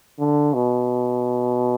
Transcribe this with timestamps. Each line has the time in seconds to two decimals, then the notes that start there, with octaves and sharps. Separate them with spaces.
0.20 D3
0.54 B2